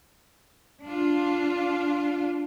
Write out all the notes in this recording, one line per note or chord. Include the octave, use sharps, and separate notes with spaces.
D4 F4